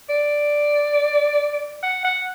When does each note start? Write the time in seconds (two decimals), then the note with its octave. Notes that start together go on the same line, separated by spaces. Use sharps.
0.09 D5
1.83 F#5
2.05 F#5